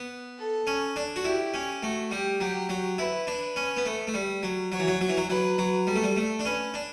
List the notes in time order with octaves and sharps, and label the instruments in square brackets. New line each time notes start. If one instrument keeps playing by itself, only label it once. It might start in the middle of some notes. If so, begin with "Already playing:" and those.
Already playing: [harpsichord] B3
[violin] A4
[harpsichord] C#4
D4
F#4
[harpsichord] E4 [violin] G4
[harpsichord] C#4
[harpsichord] A3 [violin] F#4
[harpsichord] G3 [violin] G4
[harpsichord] F#3 [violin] G4
[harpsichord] F#3
[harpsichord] E4 [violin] B4
[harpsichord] D4
C#4
B3
A3
A3
G3
F#3
[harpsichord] F#3 [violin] C#5
[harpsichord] E3
F#3
F#3
E3
F#3
[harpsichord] F#3 [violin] B4
[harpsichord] F#3
[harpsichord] G3 [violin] A4
[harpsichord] A3
G3
A3
D4
[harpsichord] C#4 [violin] B4
[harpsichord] D4